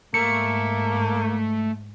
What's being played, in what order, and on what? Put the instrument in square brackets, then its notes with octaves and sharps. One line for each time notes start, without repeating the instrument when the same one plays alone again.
[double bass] G#2 [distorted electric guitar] A3 [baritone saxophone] A#3 [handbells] C#7